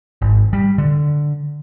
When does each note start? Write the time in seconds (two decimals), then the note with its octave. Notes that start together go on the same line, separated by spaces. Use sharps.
0.22 G#1
0.53 G3
0.78 D3